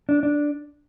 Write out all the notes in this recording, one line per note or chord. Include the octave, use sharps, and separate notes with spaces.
D4
D4